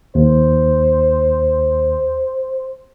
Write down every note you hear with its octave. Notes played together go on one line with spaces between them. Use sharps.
D#2 C5